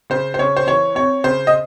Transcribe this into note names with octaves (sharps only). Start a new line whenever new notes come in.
C#3 C5
C5
C#3 C#5
C5
E3 C#5
C4 C#5
C#3 C5
D#5